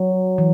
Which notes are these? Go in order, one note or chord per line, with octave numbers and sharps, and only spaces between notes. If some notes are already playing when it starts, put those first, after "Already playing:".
Already playing: F#3
E3